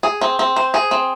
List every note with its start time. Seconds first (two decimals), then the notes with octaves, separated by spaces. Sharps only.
0.03 G#4
0.21 C4
0.39 C4
0.56 C5
0.74 G#4
0.91 C4